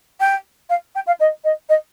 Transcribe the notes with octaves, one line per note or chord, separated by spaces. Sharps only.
G5
F5
G5
F5
D#5
D#5
D#5